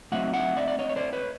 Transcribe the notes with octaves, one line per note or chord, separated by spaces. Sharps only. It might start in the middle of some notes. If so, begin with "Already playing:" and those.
F#3 A3 C4 D#4 E5 F#5
E5 F#5
D5 E5
D5
C#5 D#5
C#5
C5 D5
B4 C#5